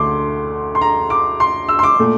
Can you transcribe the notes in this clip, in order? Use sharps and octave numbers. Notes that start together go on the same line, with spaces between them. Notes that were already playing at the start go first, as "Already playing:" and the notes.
Already playing: D2 D3 A3 C6 D6
C6
A#5
D6
C6
E6
C6
D6
A#2 A3